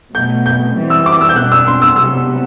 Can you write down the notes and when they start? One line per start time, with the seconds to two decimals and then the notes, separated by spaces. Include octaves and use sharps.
0.15 B2 F#3 A3 G6
0.46 G6
0.76 E3 G3 C4
0.90 E6
1.06 D6
1.21 E6
1.29 G6
1.36 B2 G3 D4 F#6
1.52 E6
1.67 C6
1.82 E6
1.96 C3 F#3 B3 E6